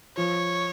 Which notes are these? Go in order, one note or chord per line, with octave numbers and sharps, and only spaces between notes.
F3 C#5